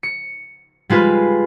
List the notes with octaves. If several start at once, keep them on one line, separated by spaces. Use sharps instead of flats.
C#7
G3 G#3 F4 B4